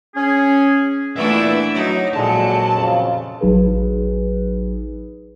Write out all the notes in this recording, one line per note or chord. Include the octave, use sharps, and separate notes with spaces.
C#4 G#4
A#2 E3 A3 B3 D4 E4 E5
F#3 D#4
A#1 A#2 D3 F#3 G#3 A5
F2 C#3 F4
A1 F#3 D#4 G#4 B4